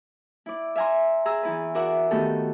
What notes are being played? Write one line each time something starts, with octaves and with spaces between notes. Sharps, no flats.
E4 D5
E5 F5 G#5 A#5 C6
G#4 A#5 E6
E2 E4 B4
F#4 A#4 D5 E5 F#5
D#3 A3 B3 F#4 G4 A4